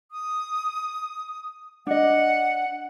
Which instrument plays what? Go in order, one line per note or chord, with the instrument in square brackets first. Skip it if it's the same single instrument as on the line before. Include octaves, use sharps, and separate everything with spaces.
[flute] D#6
[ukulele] D4 D#5 [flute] F#5